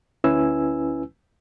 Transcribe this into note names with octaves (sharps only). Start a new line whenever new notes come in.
D2 C#4 E4 B4 G#5 E6